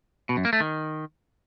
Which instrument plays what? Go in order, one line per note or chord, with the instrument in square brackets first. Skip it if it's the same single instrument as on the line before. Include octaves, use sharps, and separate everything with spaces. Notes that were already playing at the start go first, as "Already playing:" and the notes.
[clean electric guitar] B2
F#2
A#3
A3
D#3